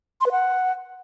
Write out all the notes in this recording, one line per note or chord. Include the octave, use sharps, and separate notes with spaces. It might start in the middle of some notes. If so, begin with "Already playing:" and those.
C6
B4
F#5